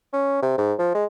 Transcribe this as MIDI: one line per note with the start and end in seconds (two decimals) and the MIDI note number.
0.13 0.41 61
0.42 0.56 48
0.58 0.73 44
0.79 0.90 53
0.95 1.05 56